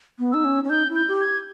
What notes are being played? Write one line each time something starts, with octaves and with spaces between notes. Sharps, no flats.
B3
D#4 E6
C#4
C#4
D#4 G6
E4
G6
G4
G#6